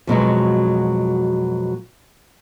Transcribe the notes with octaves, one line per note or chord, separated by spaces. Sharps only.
F2 B2 F#3 G#3